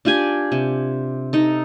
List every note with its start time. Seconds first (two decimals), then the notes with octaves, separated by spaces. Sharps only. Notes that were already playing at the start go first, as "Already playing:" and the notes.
0.05 D4 F4 G4 G#5
0.52 C3
1.33 D#4 A4